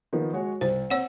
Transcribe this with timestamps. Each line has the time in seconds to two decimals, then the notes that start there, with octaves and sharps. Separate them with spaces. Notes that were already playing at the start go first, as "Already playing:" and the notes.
0.13 D#3 F3 B3
0.33 G#3 F#4 C#5
0.61 C2 C5
0.90 C4 C#5 F#5 E6